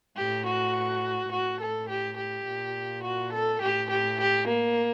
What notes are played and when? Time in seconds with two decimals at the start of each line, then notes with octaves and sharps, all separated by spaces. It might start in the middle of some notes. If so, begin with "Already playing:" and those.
0.17 A2 G4
0.47 F#4
1.32 A2 F#4
1.60 A4
1.89 G4
2.18 G4
2.47 A#2
3.03 F#4
3.33 A4
3.61 A2 G4
3.89 G4
4.19 G4
4.47 A#3